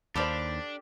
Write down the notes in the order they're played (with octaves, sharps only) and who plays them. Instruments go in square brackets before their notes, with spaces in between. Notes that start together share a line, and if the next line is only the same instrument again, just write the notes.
[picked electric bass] D#2 [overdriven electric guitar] D4 [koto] G4 A4 F5 [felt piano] C5 D5 B5